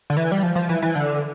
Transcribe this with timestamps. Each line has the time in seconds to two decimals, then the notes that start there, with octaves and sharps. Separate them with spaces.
0.10 D3
0.17 E3
0.32 G3
0.43 F3
0.55 F3
0.69 E3
0.82 E3
0.95 D3